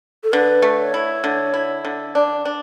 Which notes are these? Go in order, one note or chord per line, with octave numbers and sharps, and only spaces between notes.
A4
D3 B4
A3
C#5
E4
D3
E4
D3
D4
D4